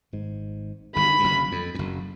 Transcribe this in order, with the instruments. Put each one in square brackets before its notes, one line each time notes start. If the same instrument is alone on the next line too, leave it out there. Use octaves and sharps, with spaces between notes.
[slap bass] G#1 G#2
[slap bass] G1 G2 [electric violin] B5
[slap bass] G2
F#1 F#2
F2
F2
F#1 F#2